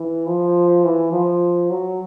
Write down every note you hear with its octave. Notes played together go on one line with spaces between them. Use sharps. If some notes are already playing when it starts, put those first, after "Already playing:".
Already playing: E3
F3
E3
F3
F#3